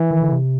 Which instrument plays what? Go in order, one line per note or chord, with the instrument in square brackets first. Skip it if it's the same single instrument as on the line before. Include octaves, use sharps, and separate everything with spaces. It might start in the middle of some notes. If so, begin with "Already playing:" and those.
Already playing: [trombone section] E3
[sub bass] D#3
D3
C3